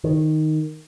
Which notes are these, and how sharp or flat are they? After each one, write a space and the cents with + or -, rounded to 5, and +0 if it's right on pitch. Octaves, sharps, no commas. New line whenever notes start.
D#3 +0